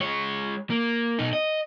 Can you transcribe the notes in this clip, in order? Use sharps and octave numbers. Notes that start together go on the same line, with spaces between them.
G#3 C#5
A#3
B2 D#4
D#5